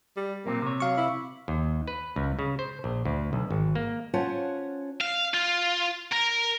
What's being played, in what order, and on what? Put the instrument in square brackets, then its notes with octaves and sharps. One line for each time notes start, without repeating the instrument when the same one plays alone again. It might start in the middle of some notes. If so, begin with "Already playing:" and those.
[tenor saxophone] G3
[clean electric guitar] B1 A#2 C4 [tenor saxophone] A#3
[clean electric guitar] C3 C#5
[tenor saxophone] F#3 [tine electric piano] F5 C#6
[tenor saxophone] E4
[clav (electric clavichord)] D#2
B4
C#2
C#3
C5
A#1
D2
B1
G#1
A#3
[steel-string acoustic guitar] C#4 F4 C5 C#5 F#5 A5
[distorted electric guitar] F5
F4
A#4